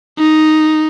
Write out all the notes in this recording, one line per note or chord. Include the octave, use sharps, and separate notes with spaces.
D#4